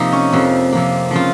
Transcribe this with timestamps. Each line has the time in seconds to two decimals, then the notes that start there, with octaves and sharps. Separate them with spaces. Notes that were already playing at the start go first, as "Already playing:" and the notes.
Already playing: C3 F3 A#3 D#4
0.13 C#4
0.32 F2 C3 F3
0.72 C3 F3 A#3
1.11 C#3 F3 C4 F4